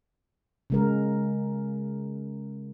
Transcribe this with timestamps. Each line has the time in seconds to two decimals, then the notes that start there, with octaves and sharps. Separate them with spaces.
0.70 C#3 G#3 A#4